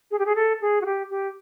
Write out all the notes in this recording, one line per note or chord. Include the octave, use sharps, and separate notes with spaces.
G#4
G4
G#4
A4
G#4
F#4
G4
G4